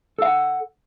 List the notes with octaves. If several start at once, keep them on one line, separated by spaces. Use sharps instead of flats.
A4 F5 F#5